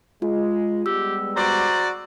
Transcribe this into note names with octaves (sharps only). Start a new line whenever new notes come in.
G#3 F4
G3 G#3 B3 G4 E6
F#4 C5 D5 A#5